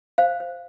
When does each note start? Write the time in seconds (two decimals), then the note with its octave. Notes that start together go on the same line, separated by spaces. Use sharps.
0.18 C5 F5
0.40 C5